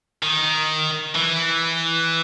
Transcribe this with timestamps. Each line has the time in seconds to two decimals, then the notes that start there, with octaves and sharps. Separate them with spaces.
0.23 D#3
1.15 E3